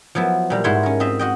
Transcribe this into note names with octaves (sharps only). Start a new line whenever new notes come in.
F3 F#3 B3 E4
A#2 G3 A#5
G#2 E4 F#4 C5 C#5 C6
C#4 A#4
C4 F4 D#5 E5
F#4 D#5 G5